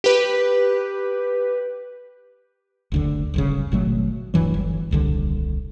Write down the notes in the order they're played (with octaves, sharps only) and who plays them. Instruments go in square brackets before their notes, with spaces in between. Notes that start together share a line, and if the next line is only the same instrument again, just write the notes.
[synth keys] G4 B4
[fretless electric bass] F#1 D2 D3
D1 G1 C#3
G#1 B2 F#3 A3
D1 G2 E3 F#3
G1
D#1 C2 D3